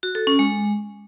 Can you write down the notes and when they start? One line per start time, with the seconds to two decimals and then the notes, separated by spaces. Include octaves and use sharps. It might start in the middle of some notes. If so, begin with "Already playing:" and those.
0.03 F#4
0.15 A4
0.27 C#4
0.39 G#3